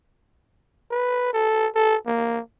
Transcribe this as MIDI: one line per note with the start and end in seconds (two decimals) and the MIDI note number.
0.91 1.32 71
1.33 1.68 69
1.75 1.96 69
2.07 2.41 58